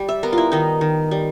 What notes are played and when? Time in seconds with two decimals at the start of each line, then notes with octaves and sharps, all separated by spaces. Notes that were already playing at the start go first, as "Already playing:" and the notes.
Already playing: G3
0.08 E5
0.23 B3 A#4
0.33 F4
0.38 E4
0.52 D#3 D#4
0.81 D#3
1.11 G3